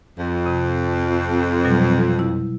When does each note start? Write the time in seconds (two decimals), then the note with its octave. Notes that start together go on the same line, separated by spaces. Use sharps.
0.18 F2
0.46 C3
1.64 B2 F#3 G3
2.19 E4